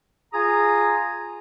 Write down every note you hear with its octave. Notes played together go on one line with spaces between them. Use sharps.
F4 G#4 G#5 A#5 D#6